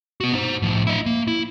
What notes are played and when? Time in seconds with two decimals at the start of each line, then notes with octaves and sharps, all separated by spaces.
0.21 B3 F#4
0.34 D#4 C5
0.62 A2 F3
0.87 E4 D#5
1.06 A#3
1.28 E4